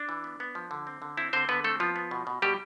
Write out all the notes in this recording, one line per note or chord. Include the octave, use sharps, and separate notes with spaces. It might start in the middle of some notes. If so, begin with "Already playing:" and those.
Already playing: D4
E3
B3
B3
F3
D3
C4
D3
C4 E4
D3 C4 C5
D3 B3 B4
A3 C4 A4
F3 B3 F4
B3
B2
B2
B2 G3 G4